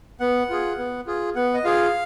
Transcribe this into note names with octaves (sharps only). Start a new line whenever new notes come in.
B3 F#5
F4 G#4
B3
F4 G#4
B3 F#5
D#5
F4 G#4 F5